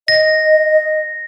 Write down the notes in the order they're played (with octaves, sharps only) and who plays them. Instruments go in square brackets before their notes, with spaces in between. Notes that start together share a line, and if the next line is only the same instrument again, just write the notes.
[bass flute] D#5 [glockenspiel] A#6